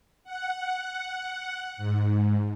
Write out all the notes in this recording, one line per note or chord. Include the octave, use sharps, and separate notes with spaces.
F#5
G#2